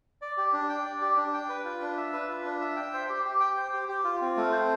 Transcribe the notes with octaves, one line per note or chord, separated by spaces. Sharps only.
D5
G4
D4
G5
D5
G4
D4
G5
B4
F4
D4
E5
B4
F4
D4
E5
G5
C5
G4
G4
G5
C5
G4
G4
F4
C4
A3
C5